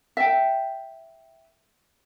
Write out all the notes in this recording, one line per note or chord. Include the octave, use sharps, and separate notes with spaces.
E5 G5